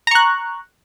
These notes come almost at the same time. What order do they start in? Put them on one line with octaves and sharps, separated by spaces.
A#5 C#6 F#6